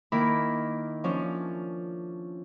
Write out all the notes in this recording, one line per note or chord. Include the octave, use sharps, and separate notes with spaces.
D#3 A#3 E4 A#4 B5 D6
F3 C#4 D4